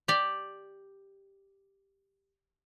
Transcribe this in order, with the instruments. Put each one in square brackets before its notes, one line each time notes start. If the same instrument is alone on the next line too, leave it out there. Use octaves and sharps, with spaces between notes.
[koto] G4 D5